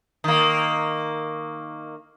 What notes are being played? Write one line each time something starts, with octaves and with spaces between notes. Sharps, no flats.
D#3 A#3